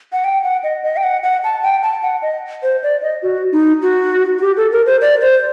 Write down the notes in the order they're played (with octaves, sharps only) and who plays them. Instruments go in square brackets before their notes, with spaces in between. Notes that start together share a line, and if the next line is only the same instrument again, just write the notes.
[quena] F#5
G5
F#5
D#5
D#5
G5
F#5
F#5
A5
G5
A5
F#5
D#5
C5
D5
D#5
F#4
D#4
F#4
F#4
G4
A4
A#4
C5
D5
C5